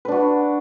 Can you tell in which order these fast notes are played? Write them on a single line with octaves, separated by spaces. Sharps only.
B4 D4 F#4